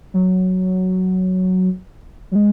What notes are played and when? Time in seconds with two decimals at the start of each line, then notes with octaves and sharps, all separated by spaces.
0.14 F#3
2.31 F#3
2.35 G#3